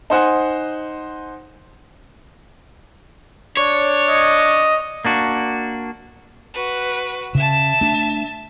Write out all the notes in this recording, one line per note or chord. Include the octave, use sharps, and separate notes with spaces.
D#4 C5 F#5 G#5
D4 C#5
D#5
A#3 D4 F#4
F#4 B4
C#3 E5 A5
A3 D4